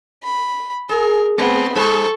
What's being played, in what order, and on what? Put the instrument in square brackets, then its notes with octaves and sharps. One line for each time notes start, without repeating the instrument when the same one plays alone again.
[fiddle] B5
[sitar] G#4 [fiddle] A#4
[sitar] G#3 [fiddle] B3 C4
[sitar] G#2 G3 C5 [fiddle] A4 C#6